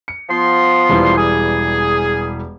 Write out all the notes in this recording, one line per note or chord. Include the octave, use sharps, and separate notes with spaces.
C#7
F3 B3 C6
E1 E3 G3
G#4